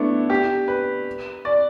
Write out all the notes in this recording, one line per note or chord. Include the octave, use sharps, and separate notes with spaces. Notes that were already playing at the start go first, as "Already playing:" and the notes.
Already playing: A3 B3 D4 E4
G4
B4
D5